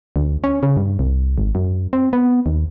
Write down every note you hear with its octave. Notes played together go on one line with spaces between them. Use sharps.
D2
C#4
C#3
G2
C2
G#1
F#2
C4
B3
D#2